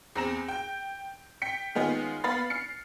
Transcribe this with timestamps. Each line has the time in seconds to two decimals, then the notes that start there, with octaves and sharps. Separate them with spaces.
0.15 E2 C4 A#5 A#6 E7
0.48 G5 G6
1.42 G5 B6 C#7
1.75 D#3 G#3 B3 C#4 F4
2.24 B3 F5 B5 A6
2.50 F6 C7 C#7